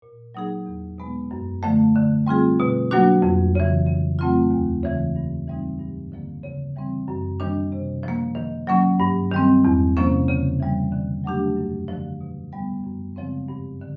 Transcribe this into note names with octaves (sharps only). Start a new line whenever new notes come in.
A#2
F#3 A#3 D#4 G#4
E2
B2 G#3 B3
F#2
D3 F3 A3
D3
G3 C4 F4 G#4
B2
F#3 A#3 D4 F#4
F2
C#3 E3
C#3
F#3 A3 C4 F4
D#2
C#3 E3 G#3
G2
E3 G3 C4 D#4
G2
D3 F3 A#3
C#3
E3 G3 C4
F#2
D#3 G3 A#3 D4
C3
F3 A#3
D#3
F#3 A#3 C#4
G2
D#3 G3 C4
E2
C3 F3 A#3 C#4
C#3
E3 G3
D3
F#3 A3 D4 G4
F#2
D3 F3
B2
G3 B3
F#2
C#3 F3 G#3 C4
G2
D3